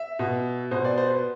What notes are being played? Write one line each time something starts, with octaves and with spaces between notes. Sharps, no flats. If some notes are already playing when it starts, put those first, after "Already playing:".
Already playing: E5
B2
B2 C5
D5
C5
B4